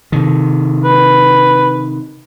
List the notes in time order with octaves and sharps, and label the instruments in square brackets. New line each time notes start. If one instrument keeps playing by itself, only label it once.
[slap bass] C3 D#3
[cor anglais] B4